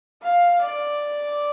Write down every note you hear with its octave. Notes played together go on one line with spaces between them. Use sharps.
F5
D5